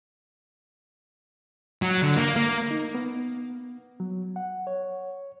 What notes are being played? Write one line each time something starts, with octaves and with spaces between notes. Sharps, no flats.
F#3
D3
A#3
A#3
D#4
B3
F#3
F#5
C#5